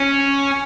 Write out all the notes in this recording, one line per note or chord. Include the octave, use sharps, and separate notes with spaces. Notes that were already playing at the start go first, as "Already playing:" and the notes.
Already playing: C#4